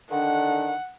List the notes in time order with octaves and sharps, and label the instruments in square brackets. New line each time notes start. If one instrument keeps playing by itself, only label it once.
[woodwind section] D3 D#3 D4 [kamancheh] F#5